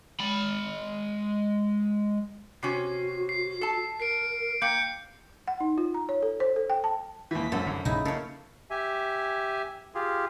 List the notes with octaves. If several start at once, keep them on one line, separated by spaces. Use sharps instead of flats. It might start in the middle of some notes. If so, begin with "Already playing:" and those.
G#3 B5
C3 C#4 F#4 C7
C7
A4 A5
A#4 C7 D7
A#3 G5 G6 C#7
F#5
D#4
F4
A#5
C#5
A4
C5
A4
G5
A5
D#2 E3 B6
C2 F#2 A4
G2 D3
A#1 C#3 D#4 E4
C#3 A#3 A4 C#5
G4 E5 G#5
F4 G4 G#4